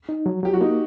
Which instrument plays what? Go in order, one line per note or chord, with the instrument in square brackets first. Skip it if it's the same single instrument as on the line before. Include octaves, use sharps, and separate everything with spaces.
[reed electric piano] D#4
F#3
[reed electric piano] F#3 [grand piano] G4
[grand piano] F#4
[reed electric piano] A#3 [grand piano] D#4